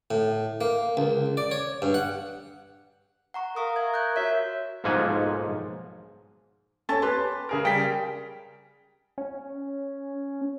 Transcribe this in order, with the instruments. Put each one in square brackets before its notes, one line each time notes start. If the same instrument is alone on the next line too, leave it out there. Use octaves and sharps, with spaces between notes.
[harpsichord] A2
A#3
C#2
D5
C#5
G2
F#5
[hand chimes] F#5 A#5 C#6
[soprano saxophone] A#4 [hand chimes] F5 C#6 D#6
[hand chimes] E5 G#6
F#6 G6
[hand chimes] F#4 C#5 [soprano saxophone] E5
[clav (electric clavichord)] B1 G#2 F3 A#3 F#5 G#5
[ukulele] C#4 [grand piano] A4 C#5 [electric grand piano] A5 A6
[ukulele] G4 B4 [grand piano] C6
[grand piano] C#3 G#4 A#4
[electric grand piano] G3 B6 [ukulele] G5
[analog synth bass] C#4